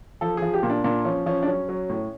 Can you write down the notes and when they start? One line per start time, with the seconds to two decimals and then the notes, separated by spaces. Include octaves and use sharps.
0.21 F3 A4
0.37 F3 G#4
0.54 G4
0.63 A#2
0.69 D4
0.84 A#2 D4
1.05 F3 C#4
1.26 F3 C#4
1.43 D4
1.47 F#3 C#4
1.69 F#3
1.90 A2